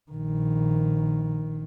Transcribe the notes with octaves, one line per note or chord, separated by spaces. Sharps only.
A#1 D#3